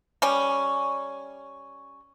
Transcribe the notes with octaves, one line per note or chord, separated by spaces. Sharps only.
G3 C#4